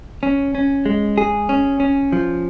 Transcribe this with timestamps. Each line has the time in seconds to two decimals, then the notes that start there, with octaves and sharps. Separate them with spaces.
0.23 C#4
0.55 C#4
0.86 G#3
1.18 G#4
1.49 C#4
1.80 C#4
2.12 F3